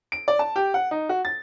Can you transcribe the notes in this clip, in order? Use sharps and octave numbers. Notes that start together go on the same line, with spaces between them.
D7
D5
A5
G4
F#5
D#4
F#4
A6